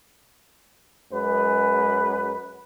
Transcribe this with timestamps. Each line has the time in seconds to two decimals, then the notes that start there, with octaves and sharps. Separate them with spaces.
1.12 F#2 G#3 B4